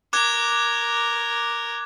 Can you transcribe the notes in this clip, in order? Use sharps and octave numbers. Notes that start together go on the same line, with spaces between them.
A#4 D6 F#6 G#6